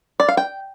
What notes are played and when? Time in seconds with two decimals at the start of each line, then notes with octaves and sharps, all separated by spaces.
0.20 D5
0.28 F5
0.37 G5